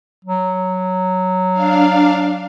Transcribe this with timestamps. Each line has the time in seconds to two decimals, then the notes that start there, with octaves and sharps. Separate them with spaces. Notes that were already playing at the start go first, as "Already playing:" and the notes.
0.25 F#3
1.53 D4 F5